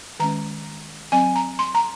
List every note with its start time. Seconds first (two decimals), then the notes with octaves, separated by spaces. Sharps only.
0.20 D#3 G#3 C#4 A#5
1.12 F#3 C4 G#5
1.36 A#5
1.59 C6
1.75 A#5